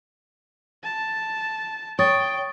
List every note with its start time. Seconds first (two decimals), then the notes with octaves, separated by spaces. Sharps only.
0.84 A5
1.99 C#5 G5 C#6 D#6 A6